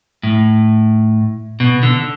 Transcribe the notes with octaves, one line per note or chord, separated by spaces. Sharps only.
A2
B2
D3